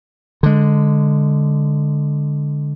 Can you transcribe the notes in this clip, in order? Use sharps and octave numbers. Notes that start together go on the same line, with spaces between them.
D3 G#3